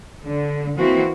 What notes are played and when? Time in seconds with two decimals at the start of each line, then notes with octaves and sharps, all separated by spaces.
0.24 D3
0.77 E3 A#3 C4 F#4